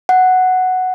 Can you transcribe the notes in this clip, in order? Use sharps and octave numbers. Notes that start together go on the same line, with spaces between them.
F#5